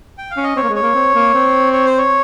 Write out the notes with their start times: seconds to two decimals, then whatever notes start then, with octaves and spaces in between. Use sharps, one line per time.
0.18 G5
0.31 F5
0.37 C#4
0.44 D#5
0.56 C4 C#5
0.63 A#3
0.69 G#3
0.76 C#5
0.82 A#3
0.95 C4
1.15 A#3
1.34 C4
1.73 C#5
1.85 C5
1.98 C#5